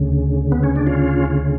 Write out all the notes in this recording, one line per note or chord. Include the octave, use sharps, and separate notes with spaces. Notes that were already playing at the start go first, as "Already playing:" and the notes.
Already playing: D2 C#3
B3
C#4
D4
C#4 F4